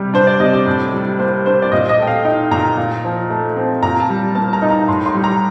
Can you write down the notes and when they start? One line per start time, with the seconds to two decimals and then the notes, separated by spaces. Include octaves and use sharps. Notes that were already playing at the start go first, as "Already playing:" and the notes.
Already playing: C3 G3
0.14 D4 C5
0.27 D5
0.40 C3 D#5
0.53 D5
0.66 A2
0.94 G3
1.19 A#3 C5
1.45 D4 C5
1.62 D5
1.72 A#2 D#5
1.89 D#5
1.98 A3 G5
2.07 F5
2.25 D#4 G5
2.51 A#2 A#5
2.77 A#2
3.04 F3
3.30 A3
3.56 C4
3.83 A#2 A#5
4.00 A5
4.10 G3
4.35 A#3 A5
4.53 A#5
4.62 D#4
4.70 A#5
4.88 A2 C6
5.06 C6
5.15 G3
5.24 A#5